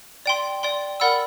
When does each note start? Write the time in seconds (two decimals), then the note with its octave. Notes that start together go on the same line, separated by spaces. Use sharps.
0.26 D5 G5 C6
0.63 D5 G5 C6
1.00 A#4 D5 F#5 B5 E6